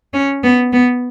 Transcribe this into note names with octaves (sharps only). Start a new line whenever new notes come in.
C#4
B3
B3